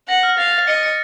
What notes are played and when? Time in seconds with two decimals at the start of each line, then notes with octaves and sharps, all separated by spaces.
0.08 F#5 A#6
0.23 F6
0.38 F5 A6
0.53 A6
0.67 D#5 C#7
0.83 C#7